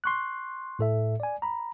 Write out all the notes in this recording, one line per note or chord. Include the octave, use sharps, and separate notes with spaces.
C6 C#6 F#6
A2 A4 E5
D5 G#5
A#5 B5